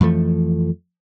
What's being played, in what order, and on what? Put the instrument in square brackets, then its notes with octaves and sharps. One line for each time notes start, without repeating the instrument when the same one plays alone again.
[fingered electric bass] F2 E3 F3 A3